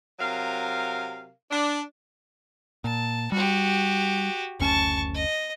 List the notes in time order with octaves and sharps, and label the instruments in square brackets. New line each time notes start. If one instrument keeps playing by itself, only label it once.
[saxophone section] C3 F#3 A#4 F5
D4
[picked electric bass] A#2 [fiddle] A5
[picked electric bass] G3 [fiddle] F#4 G4
[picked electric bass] F#1 D2 C#4 [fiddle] A5 C#6
[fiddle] D#5